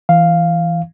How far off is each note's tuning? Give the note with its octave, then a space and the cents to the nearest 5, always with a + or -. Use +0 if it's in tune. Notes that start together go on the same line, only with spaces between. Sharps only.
E3 +5 F5 +0